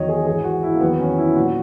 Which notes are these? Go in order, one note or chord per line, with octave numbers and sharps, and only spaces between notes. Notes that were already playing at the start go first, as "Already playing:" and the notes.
Already playing: E2 D#3 F#3 C#5 D#5
G#4
G#2 E3 G#4
F#4
E4
A#3
E2 D#3 F#3 B3
C#4
E4
A#2 F#3 F#4